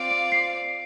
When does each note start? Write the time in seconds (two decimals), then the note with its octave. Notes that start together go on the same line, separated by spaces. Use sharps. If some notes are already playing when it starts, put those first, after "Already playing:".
Already playing: C4 F4 D5 F5 D7
0.11 D7
0.32 C7